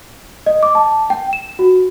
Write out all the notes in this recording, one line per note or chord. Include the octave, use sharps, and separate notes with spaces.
D#5
D6
A5
G5
E7
F#4